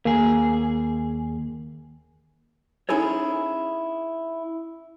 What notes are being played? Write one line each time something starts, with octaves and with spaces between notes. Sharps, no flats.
D#2 A#3 G#4
C#4 D#4 E4 G#4 A4 C#5